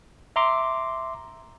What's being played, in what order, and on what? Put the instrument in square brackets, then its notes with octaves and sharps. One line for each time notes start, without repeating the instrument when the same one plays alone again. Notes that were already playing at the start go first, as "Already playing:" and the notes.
[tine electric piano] E5 A#5 C6 D6